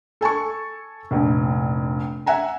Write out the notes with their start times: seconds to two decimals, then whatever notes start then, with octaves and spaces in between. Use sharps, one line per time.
0.21 A4 G#5 A5 C#6
1.11 F1 A#1
2.26 E5 F#5 G#5 A#5